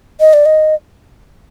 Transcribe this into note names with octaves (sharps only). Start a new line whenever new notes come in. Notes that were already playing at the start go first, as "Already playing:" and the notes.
D#5
D5
D#5